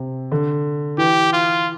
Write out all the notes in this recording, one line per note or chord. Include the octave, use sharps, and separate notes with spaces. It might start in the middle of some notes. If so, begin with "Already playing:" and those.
Already playing: C3
D3
E3 G4
F4